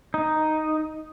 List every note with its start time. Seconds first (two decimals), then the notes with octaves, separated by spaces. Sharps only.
0.14 D#4